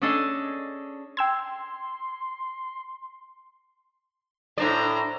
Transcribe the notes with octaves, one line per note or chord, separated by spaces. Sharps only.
C#4 D4 G#4 A4 D#5 G#5
G5 C6 E6 G#6
A2 D4 C5 D5 A#5